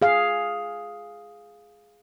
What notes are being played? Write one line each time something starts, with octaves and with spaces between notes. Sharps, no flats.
G#4 F5